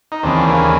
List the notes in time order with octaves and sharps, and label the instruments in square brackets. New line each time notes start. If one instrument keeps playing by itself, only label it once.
[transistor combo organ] D#4
D#2 C#3 E3 C4 D4
A#3